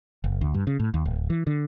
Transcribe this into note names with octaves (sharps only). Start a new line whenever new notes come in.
F#1
D2
G2
C#3
A2
D#2
D1
E3
D3